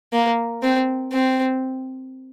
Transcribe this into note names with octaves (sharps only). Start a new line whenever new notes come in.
A#3
C4
C4